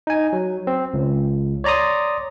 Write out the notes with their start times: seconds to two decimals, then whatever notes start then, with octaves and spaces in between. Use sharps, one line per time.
0.07 D#4 G#5
0.33 F#3
0.67 C4
0.94 C#2
1.64 C#5 D5 A#5 C6 D#6